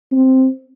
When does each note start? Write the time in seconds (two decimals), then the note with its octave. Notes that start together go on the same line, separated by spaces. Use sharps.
0.12 C4